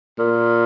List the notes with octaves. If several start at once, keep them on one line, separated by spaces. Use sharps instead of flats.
A#2